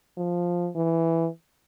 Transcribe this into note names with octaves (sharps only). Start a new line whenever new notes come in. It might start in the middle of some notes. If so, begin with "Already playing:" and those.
F3
E3